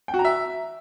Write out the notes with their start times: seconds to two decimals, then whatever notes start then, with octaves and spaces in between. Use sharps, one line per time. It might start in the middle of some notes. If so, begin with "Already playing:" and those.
0.08 G5
0.14 F#4
0.19 A#5
0.25 E5